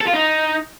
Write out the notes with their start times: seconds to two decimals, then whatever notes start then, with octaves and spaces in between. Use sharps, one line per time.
0.01 A4
0.08 F4
0.15 D#4